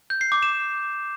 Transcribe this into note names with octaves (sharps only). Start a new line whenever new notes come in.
G6
C7
D6
E7